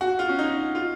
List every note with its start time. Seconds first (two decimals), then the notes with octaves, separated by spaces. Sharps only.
0.01 F#4
0.19 F4
0.29 C#4
0.39 D#4
0.75 F4